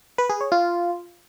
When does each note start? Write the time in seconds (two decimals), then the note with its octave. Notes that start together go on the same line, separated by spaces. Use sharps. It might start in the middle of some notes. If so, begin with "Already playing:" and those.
0.18 B4
0.30 G#4
0.41 C#5
0.52 F4